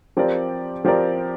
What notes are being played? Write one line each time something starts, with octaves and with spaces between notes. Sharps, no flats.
F3 C4 G4 A#4 D5
F3 C4 G4 A#4 D5